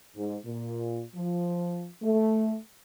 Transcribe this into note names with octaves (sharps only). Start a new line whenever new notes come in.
G#2
A#2
F3
A3